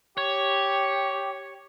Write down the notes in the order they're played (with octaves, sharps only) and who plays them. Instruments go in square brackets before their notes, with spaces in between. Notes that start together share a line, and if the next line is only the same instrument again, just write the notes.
[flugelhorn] G4 [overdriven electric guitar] C#5